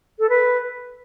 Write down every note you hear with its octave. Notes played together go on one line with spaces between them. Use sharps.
A4
B4